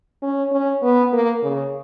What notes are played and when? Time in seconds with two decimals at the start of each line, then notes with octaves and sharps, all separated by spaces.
0.23 C#4
0.52 C#4
0.83 B3
1.13 A#3
1.43 C#3